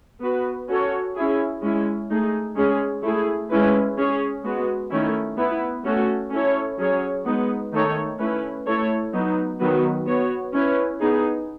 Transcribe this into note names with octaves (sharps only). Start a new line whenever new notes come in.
B3 F#4 B4
C#4 F#4 A4 C#5
C#4 E4 G#4
G#3 C#4 E4
A3 D#4 G#4
G#3 C#4 G#4
A3 E4 G#4
G#3 C#4 E4 B4
C#4 G#4 C#5
G#3 B3 F#4
D#3 A3 C#4 E4
B3 E4 B4
A3 C#4 F#4 A4
C#4 E4 A4 C#5
F#3 C#4 G#4 C#5
G#3 B3 D#4
D#3 A3 D#4 A4 C#5
A3 C#4 E4 B4
A3 E4 A4 C#5
F#3 B3 D#4
D#3 F#3 B3 F#4 B4
B3 F#4 C#5
C#4 E4 B4
B3 D#4 G#4